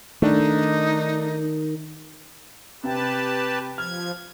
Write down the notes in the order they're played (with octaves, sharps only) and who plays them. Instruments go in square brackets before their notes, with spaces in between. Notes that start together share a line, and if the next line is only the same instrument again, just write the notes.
[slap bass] D#3 [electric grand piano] A3 D4 [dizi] D#4
[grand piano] C3 G5 [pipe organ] G4 B4 A5
[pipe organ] F3 G#6 [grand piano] F6